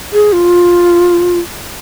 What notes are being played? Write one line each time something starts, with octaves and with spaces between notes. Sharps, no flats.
G#4
F4